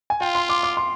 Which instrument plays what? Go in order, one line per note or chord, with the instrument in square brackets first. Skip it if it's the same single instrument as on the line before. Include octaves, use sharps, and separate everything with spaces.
[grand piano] G#5
[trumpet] F4 [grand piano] G5
[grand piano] C6
D6
D6
C6